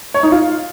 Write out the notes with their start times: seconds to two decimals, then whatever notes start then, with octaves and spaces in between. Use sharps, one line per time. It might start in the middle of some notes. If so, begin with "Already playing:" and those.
0.14 C#5
0.23 D#4
0.32 F4